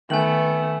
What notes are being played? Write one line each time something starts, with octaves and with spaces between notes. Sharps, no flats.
D#3 A3 B3 G5 G#5 F#6 F#7